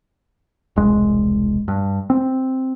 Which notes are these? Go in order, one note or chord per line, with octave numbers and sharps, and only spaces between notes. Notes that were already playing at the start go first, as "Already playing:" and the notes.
E1 C2 G#3
G2
C4